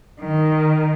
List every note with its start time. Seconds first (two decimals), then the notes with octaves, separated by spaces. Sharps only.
0.19 D#3